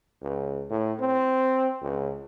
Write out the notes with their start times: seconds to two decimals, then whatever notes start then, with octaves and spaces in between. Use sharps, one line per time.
0.22 C#2
0.70 A2
1.00 C4
1.82 C#2